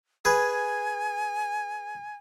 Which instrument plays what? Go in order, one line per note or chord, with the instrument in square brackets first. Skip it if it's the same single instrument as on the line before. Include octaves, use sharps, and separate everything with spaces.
[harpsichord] G#4 B4 [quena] G#5